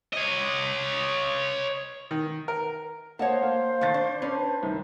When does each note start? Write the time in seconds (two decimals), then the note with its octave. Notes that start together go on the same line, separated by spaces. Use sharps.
0.13 C#5 D#5
2.11 D#3
2.48 A#4
3.19 A#3 C5 C#5 D#5 F#5 A5
3.42 A#3 F5
3.81 D#3 A3 C#6 A6
3.94 D4
4.22 C#4 D4 B4
4.63 C2 D#3 D#4